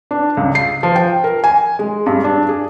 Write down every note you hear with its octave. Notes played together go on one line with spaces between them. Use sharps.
D4
C#2
C7
F3
G5
A#4
G#5
G#3
G2
D4
G#4